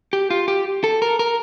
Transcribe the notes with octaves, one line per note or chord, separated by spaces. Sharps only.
G4
F4
G4
A4
A#4
A#4